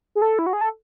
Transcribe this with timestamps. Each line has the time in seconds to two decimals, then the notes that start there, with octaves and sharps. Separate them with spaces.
0.15 G#4
0.22 A4
0.39 E4
0.46 F#4
0.53 G#4
0.61 A4